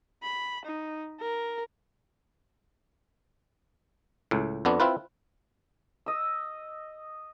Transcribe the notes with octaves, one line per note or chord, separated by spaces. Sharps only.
B5
D#4
A#4
C#2 A2
F2 B3 D4
C4 E4 F4 B4
D#5 E6